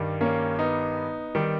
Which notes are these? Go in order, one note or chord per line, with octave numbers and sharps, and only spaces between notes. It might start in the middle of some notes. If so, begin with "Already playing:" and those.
Already playing: G2 D#3 G3
A#3 C#4
B3 D#4
D#3 G3